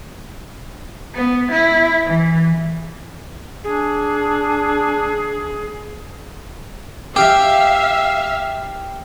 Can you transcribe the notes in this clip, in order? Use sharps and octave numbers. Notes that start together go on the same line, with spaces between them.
B3
E4
E3
D4 G#4
G4 E5 F5